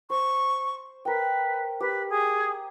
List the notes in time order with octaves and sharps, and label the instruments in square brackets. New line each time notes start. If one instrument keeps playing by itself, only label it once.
[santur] C5 [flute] C#6
[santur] A#4 G5 [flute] B4
[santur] G4 [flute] B4
[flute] G#4